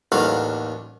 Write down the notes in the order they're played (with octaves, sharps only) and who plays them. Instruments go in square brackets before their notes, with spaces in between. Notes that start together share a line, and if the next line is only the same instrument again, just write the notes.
[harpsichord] A1 D#2 D3 D#3 F#4 F5